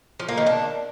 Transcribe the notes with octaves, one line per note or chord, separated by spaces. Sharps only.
F3
A#3
D#3
D4